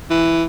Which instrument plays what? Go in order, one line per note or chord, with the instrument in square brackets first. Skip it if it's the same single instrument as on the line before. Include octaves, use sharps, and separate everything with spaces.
[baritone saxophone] E3